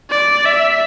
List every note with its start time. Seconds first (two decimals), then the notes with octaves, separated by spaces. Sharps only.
0.11 D5
0.46 E5